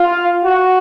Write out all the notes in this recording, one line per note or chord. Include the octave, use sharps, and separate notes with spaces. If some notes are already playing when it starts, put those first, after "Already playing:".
Already playing: F4
F#4